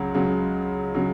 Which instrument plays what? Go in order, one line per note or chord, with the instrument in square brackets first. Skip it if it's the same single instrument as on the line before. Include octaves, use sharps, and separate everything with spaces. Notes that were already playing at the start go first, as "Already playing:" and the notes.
Already playing: [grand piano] C#2 C#3 F#3
C#2 C#3 F#3
C#3 F#3